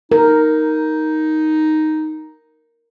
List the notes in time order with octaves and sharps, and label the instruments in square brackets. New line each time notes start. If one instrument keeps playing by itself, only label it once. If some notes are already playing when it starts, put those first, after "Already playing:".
[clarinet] D#4 [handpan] A#4